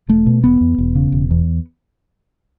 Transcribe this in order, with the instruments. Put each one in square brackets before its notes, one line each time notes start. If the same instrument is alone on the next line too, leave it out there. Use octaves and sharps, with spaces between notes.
[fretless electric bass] E1 A3
B2
E1 B3
E2
E1
C#3
E1
E2